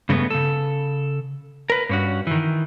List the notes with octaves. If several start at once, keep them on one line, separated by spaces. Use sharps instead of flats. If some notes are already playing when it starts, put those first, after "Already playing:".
G2 C#3 G#3 A3 B3
C#3 A4
A#4 B4
G2 C#4 F#4
D#3 E3